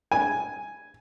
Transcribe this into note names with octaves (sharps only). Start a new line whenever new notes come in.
G#5